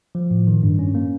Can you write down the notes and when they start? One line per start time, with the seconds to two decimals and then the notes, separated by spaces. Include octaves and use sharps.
0.15 F3
0.31 A2
0.47 D#3
0.63 G2
0.79 C#4
0.95 A#3